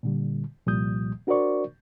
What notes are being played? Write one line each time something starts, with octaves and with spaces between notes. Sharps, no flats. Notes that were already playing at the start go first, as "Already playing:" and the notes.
A#2 D3 G3
C2 A#2 F3 G3 D#6 G6
D4 F#4 A#4 C5 D5 C#6